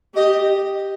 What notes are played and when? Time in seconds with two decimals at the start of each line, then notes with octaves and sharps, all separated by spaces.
0.15 G4 D#5